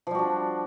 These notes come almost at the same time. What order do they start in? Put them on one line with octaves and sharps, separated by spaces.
F3 G3 F#4 D4